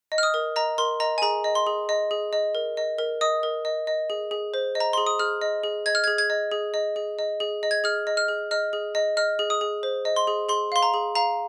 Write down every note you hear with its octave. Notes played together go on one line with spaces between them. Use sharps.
D#5
F6
D#6
A#4
D#5 A#5
A#4 C6
D#5 A#5
G#5
G#4 A#5
D#5
C6
G#4
D#5
G#4
D#5
A#4
D#5
A#4
D#5 D#6
A#4
D#5
D#5
G#4
G#4
C5
D#5
A#5
G#4 C6
D#6
G#4 F6
D#5
G#4
D#5 G#6
F6
G#4 G#6
G#6
D#5
G#4
D#5
G#4
D#5
G#4
D#5
G#6
G#4 F6
D#5
F6
G#4
D#5 F6
G#4
D#5
D#5 F6
G#4
D#6
G#4
C5
D#5
C6
G#4
G#4 C6
F5 C6
A#5
G#4
F5 A#5